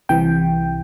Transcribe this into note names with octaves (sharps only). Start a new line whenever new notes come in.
C2 C3 E3 G5